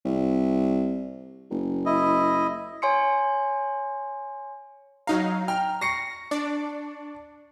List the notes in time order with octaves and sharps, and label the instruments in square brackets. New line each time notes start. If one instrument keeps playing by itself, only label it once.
[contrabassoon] C2
F#1
[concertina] E4 D#5
[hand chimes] C#5 G#5 C6 C#7
[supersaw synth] F#3 D#4 F5 [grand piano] A#5
[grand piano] G5 A#5 [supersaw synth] F6
[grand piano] C#6 C7 C#7 [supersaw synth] A#6
[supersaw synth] D4 D5